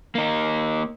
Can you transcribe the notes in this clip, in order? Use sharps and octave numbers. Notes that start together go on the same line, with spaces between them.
A#3 D#4